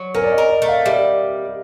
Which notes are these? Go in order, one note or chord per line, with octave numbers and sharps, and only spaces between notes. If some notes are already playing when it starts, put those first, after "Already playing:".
Already playing: F#3
C#4 A#4
D5
D#5
A#4
D5
A3
F5
G3 E5